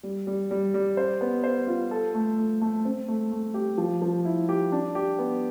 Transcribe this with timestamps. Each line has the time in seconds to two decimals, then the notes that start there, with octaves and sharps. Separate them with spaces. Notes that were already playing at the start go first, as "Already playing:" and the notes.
0.03 G3
0.27 G3
0.51 G3
0.74 G3
0.97 C5
1.21 B3
1.44 C5
1.67 F4
1.91 A4
2.14 A3
2.38 A3
2.62 A3
2.85 C4
3.08 A3
3.32 A3
3.54 G4
3.78 F3
4.02 F3
4.25 E4
4.49 G4
4.72 D4
4.95 G4
5.19 B3